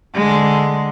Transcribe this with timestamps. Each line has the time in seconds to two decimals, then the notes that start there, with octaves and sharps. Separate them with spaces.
0.15 D3 G#3